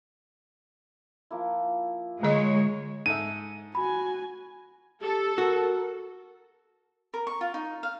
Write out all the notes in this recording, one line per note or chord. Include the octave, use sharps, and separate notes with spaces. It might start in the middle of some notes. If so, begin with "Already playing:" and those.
F3 A#3 E4
D3 G#3 G#4 C#5 D#5
G#2 A4 E5 D#7
F#4 G#5 B5
G4 A4
F#4 A#4
A#4
C#6
F4
D#4
F5